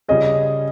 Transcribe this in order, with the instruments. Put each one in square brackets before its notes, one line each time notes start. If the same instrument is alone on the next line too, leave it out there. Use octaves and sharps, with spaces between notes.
[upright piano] C#3 G3 C#4 F4 G#4 [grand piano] D#5